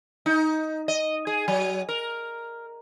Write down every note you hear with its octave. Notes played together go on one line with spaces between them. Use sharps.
D#4
D#5
G#4
F#3
A#4